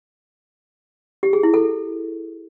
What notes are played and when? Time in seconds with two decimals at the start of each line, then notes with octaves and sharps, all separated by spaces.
1.23 G4
1.33 G#4
1.43 E4
1.54 A4